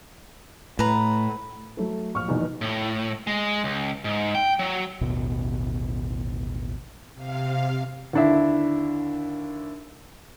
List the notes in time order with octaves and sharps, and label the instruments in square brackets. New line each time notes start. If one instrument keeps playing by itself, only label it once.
[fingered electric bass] A2 [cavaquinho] B4 A#5
[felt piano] F#3 A3 A4
[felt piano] A#1 F6 [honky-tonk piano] C#6
[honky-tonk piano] E2 B2 D#3
[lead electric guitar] A2
G#3
C#2
G#2
G5
F#3
[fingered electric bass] A1 D#2 B2
[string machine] C3 F5
[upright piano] D#2 D3 D4 E4 E5